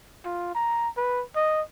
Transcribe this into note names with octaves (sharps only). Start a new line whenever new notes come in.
F4
A#5
B4
D#5